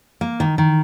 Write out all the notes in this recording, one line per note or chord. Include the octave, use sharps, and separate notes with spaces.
A#3
D#3
D#3